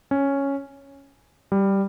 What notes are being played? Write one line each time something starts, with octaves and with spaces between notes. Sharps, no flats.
C#4
G3